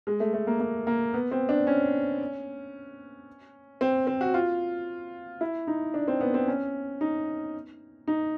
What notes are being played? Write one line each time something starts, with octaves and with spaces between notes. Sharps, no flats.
G#3
A3
A3
A#3
A#3
A#3
B3
C4
D4
C#4
C4
C4
F#4
F4
E4
D#4
D4
C4
B3
C4
C#4
D#4
D#4